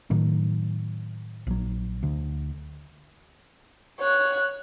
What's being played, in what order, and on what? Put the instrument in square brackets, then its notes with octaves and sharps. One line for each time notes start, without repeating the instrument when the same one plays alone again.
[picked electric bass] A2 D#3 F#3
A#1 F#3
D2
[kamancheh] C#5 F#6